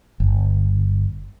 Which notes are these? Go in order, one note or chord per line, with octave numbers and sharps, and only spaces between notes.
G1